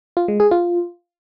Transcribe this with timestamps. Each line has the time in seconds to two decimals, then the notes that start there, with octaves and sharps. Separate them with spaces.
0.17 F4
0.28 G#3
0.40 G#4
0.51 F4